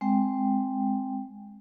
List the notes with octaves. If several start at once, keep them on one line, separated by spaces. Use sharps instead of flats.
G#3 C4 G5